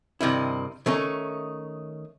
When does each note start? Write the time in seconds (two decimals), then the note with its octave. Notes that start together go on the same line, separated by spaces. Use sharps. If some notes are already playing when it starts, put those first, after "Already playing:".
0.21 G2 C3 D#3 E4
0.86 D#3 A3 C#4 D#4